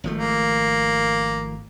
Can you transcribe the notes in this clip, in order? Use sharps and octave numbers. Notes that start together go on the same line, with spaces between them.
G#1 F3 A3
A#3